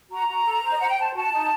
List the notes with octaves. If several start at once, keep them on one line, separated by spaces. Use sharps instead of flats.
F#4 A#5
F#4
A4
C5
D#5
C5 F#5
G5
C5 A5
F#4 A5
D#4